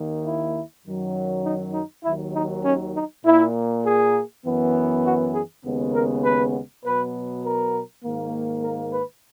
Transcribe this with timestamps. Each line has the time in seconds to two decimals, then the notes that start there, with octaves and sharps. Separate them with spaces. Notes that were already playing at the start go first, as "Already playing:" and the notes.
Already playing: D#2 D#3 A#3
0.24 E4
0.84 F#2 D#3 F#3
1.45 D#4
1.74 D#4
2.04 D#2 D#3 F#3 E4
2.34 D#4
2.64 C#4
2.94 D#4
3.23 A#2 A#3 E4
3.85 G#4
4.45 F#2 E3 B3
5.03 F#4
5.34 G#4
5.63 D#2 C#3 G#3 B3
5.93 A#4
6.24 B4
6.83 B2 F#3 B3 B4
7.44 A#4
8.03 G#2 D#3 A#3
8.63 A#4
8.93 B4